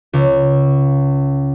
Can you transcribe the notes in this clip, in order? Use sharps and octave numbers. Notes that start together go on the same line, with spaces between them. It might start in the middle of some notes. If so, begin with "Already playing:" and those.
C#2